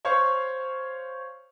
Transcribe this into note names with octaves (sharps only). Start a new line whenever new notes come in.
C5 C#5 F5 C#6